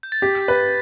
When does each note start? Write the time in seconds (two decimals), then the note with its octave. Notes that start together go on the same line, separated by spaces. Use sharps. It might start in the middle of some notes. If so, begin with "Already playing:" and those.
0.03 G6
0.12 A6
0.22 G4 B6
0.48 B4